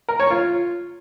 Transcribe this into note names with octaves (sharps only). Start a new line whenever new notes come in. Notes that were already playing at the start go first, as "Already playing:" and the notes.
A#4
C#5
F4